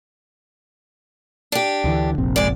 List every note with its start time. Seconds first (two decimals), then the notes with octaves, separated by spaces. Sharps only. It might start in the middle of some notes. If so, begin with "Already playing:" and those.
1.52 D4 G4
1.84 D2 D3 E3
2.18 F1 A#1 C4
2.36 G#3 D5